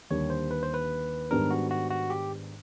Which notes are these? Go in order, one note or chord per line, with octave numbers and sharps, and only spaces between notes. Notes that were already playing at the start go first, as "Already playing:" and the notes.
D#2 D3 G3 C#5
C5
B4
C5
B4
G#2 D#3 G3 B3 D4 A#4
F#4
F#4
F#4
G4